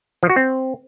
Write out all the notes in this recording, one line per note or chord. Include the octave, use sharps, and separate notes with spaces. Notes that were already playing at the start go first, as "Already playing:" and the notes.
F3
F#4
C4